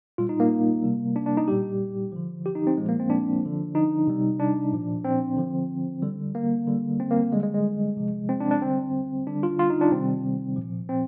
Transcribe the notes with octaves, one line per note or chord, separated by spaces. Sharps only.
A#2 G3 F4
D#4
A#3
C3 G3
D4
D4
D#4
A#2 G3 G4
D3 F3
G4
D#4
C4
A#2 F3 G#3
A#3
C4
D4
D3 F3
D#4
C3 G3
D4
A#2 F3
C4
D3 F3
D3 G3
A#3
D3 G3
C4
A#3
D3 G3 G#3
G#3
G#3
C3 F3
C4
D4
D4
D3 G3 C4
D3 G3 D4
F4
F4
D#4
D4
C3 D#3 G3 C4
A#2 F3
C4